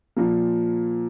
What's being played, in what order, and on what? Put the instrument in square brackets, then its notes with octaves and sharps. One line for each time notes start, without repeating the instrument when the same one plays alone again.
[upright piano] A#2 F3 A#3